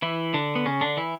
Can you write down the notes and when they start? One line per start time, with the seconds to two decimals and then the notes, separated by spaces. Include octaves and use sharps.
0.02 E3 E4
0.34 D3 D4
0.55 B3
0.65 C#3 C#4
0.81 D3 D4
0.97 E3 E4